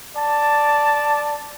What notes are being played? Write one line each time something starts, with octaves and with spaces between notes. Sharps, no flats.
D5 A5